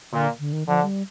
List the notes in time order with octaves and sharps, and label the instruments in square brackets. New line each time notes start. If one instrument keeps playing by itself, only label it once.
[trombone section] A#2 [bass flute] D3
[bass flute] D3
D#3
[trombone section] D3 [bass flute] F3
[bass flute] G3